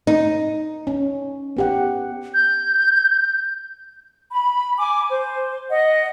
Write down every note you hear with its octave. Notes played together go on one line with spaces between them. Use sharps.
D#4
C#4
B3 G4 F#5
G6
B5
G#5 D6
C5
D#5 F#5